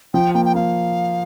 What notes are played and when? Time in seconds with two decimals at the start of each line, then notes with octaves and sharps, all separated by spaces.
0.14 F3 G5
0.34 A#3 G5
0.45 G5
0.54 A#3 F5